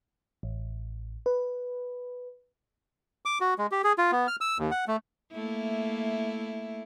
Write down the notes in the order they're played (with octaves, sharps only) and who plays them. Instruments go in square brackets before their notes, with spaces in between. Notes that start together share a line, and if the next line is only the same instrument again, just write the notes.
[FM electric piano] A1
B4
[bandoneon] D6
F#4
G#3
G4
G#4
F4
B3
F6
E6
D#2
F#5
A3
[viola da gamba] A3 A#3 E4